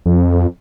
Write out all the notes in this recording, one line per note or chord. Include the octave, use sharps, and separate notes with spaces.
F2